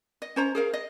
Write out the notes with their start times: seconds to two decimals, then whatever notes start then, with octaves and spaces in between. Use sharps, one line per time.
0.22 D#5
0.36 C#4 C5 A#5
0.55 G#4 A#4 F5
0.73 D#5